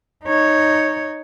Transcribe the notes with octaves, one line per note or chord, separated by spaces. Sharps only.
D#4 C#5